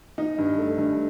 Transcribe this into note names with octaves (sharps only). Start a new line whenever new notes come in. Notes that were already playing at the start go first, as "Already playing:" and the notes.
D#4
G2
A3
G2